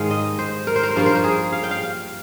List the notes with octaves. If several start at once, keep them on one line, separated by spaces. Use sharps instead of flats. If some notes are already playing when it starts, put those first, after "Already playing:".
Already playing: G#2 D#3 G#3 F5
D#5
C5
A#4
C5
A#4
C5
G2 F3 A#3 A#4
C5
A#4
G#4
F5
G5
F5